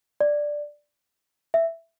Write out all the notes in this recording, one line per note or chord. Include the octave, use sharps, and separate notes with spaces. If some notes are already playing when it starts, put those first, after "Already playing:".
D5
E5